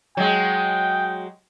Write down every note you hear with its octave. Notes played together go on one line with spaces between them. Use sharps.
F#3 G#3 G5